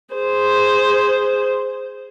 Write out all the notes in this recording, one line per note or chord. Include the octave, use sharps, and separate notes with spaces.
G#4 C5